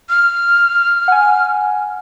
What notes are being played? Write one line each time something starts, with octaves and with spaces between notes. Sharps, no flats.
F6
F#5 G#5